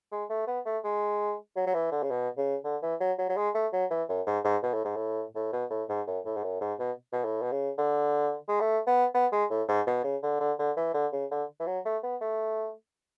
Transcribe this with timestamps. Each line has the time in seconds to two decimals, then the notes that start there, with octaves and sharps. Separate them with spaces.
0.12 G#3
0.30 A3
0.47 B3
0.66 A3
0.84 G#3
1.56 F#3
1.67 F#3
1.74 E3
1.92 D3
2.03 C#3
2.10 B2
2.37 C#3
2.64 D3
2.83 E3
3.00 F#3
3.18 F#3
3.29 F#3
3.37 G#3
3.55 A3
3.73 F#3
3.91 E3
4.09 F#2
4.26 G#2
4.44 G#2
4.63 B2
4.74 A2
4.85 G#2
4.96 A2
5.35 A2
5.53 B2
5.71 A2
5.89 G#2
6.07 F#2
6.25 A2
6.37 G#2
6.43 F#2
6.61 G#2
6.79 B2
7.12 B2
7.24 A2
7.42 B2
7.52 C#3
7.78 D3
8.48 G#3
8.61 A3
8.87 B3
9.14 B3
9.32 G#3
9.50 A2
9.68 G#2
9.87 B2
10.04 C#3
10.23 D3
10.40 D3
10.59 D3
10.77 E3
10.94 D3
11.12 C#3
11.31 D3
11.60 E3
11.67 F#3
11.85 A3
12.03 B3
12.21 A3